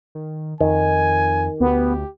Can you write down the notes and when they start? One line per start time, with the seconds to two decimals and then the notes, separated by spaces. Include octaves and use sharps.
0.15 D#3
0.60 F2 D#3 G#5
1.60 D2 B3 G4